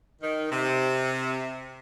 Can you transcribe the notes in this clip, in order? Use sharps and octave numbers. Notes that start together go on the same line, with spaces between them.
D#3
C3